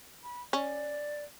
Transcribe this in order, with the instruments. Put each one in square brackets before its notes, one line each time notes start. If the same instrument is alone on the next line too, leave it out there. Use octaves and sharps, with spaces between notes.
[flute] B5
[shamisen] C#4 [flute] D5